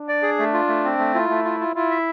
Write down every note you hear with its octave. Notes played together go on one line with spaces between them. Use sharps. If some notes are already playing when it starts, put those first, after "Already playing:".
Already playing: D4
D5
G#4
A3
F4
A3
C4
A3
E4 F4
A3
F4
F4
E4 F4
E5